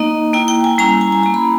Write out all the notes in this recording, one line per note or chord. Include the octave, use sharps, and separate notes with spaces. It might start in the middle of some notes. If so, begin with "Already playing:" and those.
Already playing: A#3 D#4 D#5
A#3 E4 G5
G5
G#5
G3 C#4 E4 A#5
G#5
G#5
A#3 C#4 E4 A#5
B5